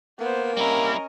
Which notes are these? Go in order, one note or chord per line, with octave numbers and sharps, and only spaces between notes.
A#3 B3 C5
G3 C#4 E4 A#4 D#5